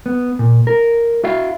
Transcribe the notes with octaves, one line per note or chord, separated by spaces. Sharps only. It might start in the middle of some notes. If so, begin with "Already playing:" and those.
B3
A#2
A#4
F#4 E5 F5